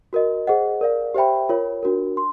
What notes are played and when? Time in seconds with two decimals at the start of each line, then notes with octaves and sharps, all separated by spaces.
0.13 F#4 A#4 D#5
0.47 G#4 C5 D#5 F#5
0.81 A#4 D5 F5
1.14 G4 C5 E5 G5 B5
1.49 F4 A#4 C#5
1.83 D4 F#4 A#4
2.17 C6